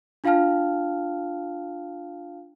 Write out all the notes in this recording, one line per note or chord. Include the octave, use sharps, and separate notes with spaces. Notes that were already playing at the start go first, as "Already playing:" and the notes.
D4 F4 F5 G5 A5 F6